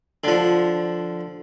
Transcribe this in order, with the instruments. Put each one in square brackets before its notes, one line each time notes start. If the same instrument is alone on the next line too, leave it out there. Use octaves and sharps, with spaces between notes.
[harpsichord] D3 F3